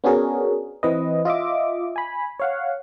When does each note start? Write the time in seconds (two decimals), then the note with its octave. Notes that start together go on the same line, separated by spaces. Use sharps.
0.04 B3 C#4 D4 F#4 G#4 A#4
0.83 E3 C4 B4 D#5
1.25 F4 D#5 E5 D6
1.96 G#5 B5
2.40 C#5 F5 F#5